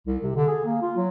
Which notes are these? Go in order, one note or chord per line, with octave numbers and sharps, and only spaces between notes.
C2
C3
D3
G#4
A#3
F4
F#3